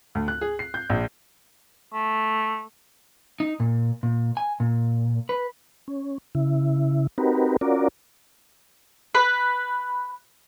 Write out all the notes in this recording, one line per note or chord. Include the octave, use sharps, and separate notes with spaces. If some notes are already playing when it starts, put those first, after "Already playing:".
D2
F#6
G#4
C7
G6
A#1
A3
D#4
A#2
A#2
G#5
A#2
B4
C#4
C#3 E4
C4 D#4 F#4 G4 A#4 B4
C#4 F4 F#4 A#4 D5
B4